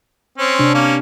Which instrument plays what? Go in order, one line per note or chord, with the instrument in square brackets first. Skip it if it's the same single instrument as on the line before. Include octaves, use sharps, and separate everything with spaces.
[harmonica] C4 C#4
[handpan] C3 D4
[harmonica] A#3 C#4